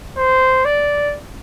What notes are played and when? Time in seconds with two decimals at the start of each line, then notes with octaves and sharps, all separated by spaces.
0.17 C5
0.65 D5